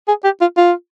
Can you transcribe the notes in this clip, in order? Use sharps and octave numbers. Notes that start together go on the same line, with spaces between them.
G#4
G4
F4
F4